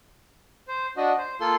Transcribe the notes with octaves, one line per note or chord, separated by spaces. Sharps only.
C5
D4 F#4 D#5
C5
A#3 F4 A4 C6